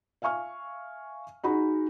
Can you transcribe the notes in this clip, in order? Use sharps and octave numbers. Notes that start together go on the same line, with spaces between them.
E5 F5 G#5 C#6 F6
D#4 F#4 G#4 B5